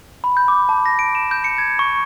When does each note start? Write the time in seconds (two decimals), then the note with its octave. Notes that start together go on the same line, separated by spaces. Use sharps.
0.24 B5
0.37 G6
0.48 D6
0.69 A5
0.86 A#6
0.99 D7
1.15 E7
1.31 G6
1.44 C#7
1.58 G#6
1.79 C#6